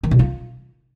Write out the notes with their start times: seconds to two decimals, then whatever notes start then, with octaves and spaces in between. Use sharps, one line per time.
0.03 D#3
0.11 B2
0.19 F4